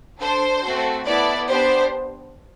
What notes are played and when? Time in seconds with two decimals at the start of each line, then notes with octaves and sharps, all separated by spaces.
0.19 D4 A4 C5
0.62 A3 C4 F#4 A4
1.05 B3 E4 A4 D5
1.48 B3 D4 G4 C5